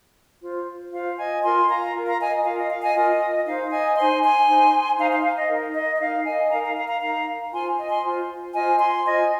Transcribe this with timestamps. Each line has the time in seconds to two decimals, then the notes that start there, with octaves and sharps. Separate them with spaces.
0.41 F4 C5
0.92 F4 C5 F5
1.18 D#5 G#5
1.42 F4 A#4 G#5 C6
1.69 F5 A#5
1.93 F4 A#4
2.06 F5 A#5
2.19 D#5 G#5
2.32 D#5
2.44 F4 A#4 F5
2.58 D#5
2.70 F5
2.82 D#5 G#5
2.95 F4 A#4 D#5
3.46 D#4 C5 F5
3.71 D#5 G#5
3.97 D#4 C5 G#5 C6
4.23 G#5 C6
4.48 D#4 C5
4.98 D#4 C5 F5 A#5
5.11 F5
5.24 F5
5.37 D#5
5.49 D#4 A#4
5.74 D#5
5.95 D#5
6.00 D#4 A#4 F5
6.25 D#5 G#5
6.50 D#4 A#4 F5 A#5
6.63 F5 A#5
6.76 F5 A#5
6.88 F5 A#5
7.02 D#4 A#4 F5 A#5
7.52 F4 C5 G#5 C6
7.78 D#5 G#5
7.90 G#5 C6
8.03 F4 C5
8.54 F4 C5 D#5 G#5
8.79 G#5 C6
9.04 F4 C5 D#5 G#5